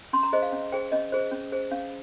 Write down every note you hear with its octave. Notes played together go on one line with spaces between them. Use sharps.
C#4 C6
A#5
G#4 C5 D#5
F5
C#4
G#4 C5 G5
C#4 D#5
G#4 C5
C#4
G#4 C5
C#4 F5